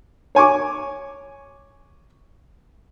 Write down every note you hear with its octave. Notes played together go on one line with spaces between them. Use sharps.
C#5 G#5 C#6 D6